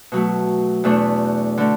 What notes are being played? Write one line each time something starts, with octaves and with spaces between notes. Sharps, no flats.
B2 F#3 A3
E2 B2 A3 D4
D3 A3